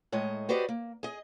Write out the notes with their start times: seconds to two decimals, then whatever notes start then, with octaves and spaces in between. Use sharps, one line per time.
0.12 A2 G#3 C#5 D#5
0.49 F#4 G4 B4 C5 D5 D#5
0.69 A#3
1.03 G#4 D#5